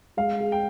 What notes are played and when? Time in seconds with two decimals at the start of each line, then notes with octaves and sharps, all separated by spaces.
0.17 G#3 F5
0.40 G#4
0.52 G5